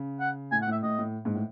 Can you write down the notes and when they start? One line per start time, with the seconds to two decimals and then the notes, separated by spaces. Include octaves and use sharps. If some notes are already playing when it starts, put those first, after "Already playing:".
Already playing: C#3
0.20 F#5
0.51 A2 G#5
0.62 F#5
0.67 A2
0.72 E5
0.83 A2 D#5
0.98 A2
1.25 G#2
1.35 A2